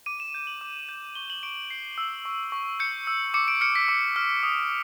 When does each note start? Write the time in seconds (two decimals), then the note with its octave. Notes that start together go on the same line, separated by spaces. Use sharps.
0.06 D6 D#7
0.20 E7
0.34 G6
0.47 F#7
0.61 D6
0.89 G6
1.15 C#6 G7
1.30 F#7
1.43 C#6 D7
1.70 G6 C7
1.98 E6
2.25 C#6
2.52 C#6
2.80 G6 C#7
3.07 E6
3.34 D6 C#7
3.48 D7
3.61 F6 C#7
3.75 B6
3.89 D6
4.16 F6
4.43 D#6